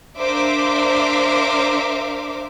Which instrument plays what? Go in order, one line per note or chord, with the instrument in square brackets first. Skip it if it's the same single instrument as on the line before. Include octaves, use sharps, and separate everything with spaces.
[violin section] D4 A#4 C5 E5 F5 D6